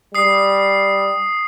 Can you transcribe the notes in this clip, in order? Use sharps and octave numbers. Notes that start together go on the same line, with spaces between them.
G3 D#6 C7